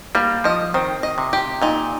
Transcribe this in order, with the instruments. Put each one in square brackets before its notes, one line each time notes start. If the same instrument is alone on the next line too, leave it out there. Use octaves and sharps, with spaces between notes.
[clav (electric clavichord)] G3 [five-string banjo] A#3
[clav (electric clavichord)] F3 [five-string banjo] D#5
[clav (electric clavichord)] D#3 [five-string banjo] C4
[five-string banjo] D#5
[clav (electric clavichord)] C3
[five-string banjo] G4
[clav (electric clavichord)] A#2 [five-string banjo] D#4